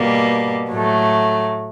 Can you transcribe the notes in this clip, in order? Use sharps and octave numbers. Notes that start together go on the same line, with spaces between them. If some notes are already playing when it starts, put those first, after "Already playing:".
Already playing: B2 G3 A#3
A2 F#3 A3